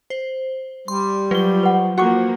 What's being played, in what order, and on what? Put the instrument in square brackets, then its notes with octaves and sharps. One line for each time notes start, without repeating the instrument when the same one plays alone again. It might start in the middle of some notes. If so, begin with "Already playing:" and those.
[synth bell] C5
[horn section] G3 [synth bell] C6
[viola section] F3 [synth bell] F#3 G7 [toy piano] B4
[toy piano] B4 F#5
[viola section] F3 A#3 [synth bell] F#4 [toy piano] F#5 C#6 D6